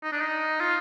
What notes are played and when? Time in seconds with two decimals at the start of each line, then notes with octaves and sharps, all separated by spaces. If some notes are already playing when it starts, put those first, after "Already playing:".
0.03 D#4
0.12 D4
0.21 D#4
0.60 F4